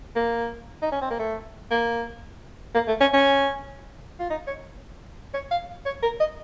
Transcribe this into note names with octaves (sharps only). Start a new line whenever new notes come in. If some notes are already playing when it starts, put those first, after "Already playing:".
A#3
D#4
C#4
C4
A#3
A3
A#3
A#3
A3
C#4
C#4
F4
D#4
C#5
C#5
F5
C#5
A#4
D#5